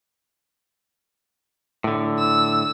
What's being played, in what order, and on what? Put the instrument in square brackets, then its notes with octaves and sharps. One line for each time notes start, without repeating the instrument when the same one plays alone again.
[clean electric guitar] A2 D3
[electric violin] E6